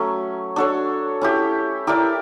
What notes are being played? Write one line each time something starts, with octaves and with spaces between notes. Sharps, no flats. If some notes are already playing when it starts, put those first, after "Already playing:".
Already playing: F#3 A3 C#4
D4 F#4 A4 C#5
C#4 E4 G4
E4 G4 A#4 D5